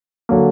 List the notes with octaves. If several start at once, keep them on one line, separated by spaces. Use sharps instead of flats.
D3 F#3 A#3